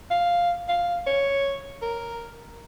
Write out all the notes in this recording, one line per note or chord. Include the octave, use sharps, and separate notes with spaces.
F5
F5
C#5
A#4